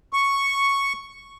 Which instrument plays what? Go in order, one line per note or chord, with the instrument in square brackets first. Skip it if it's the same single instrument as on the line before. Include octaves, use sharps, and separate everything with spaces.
[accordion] C#6